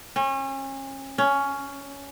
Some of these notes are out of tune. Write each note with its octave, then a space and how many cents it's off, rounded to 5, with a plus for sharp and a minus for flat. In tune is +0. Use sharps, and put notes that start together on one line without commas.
C#4 -35
C#4 +10